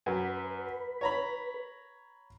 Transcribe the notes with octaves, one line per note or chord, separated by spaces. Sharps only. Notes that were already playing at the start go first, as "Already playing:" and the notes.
F#2 B4
C#5 A#5 B5